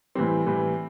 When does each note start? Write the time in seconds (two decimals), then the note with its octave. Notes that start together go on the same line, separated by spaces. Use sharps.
0.15 A2 E3 G3 C4
0.46 A2 E3 G3